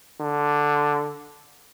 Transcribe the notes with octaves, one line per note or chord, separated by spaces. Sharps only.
D3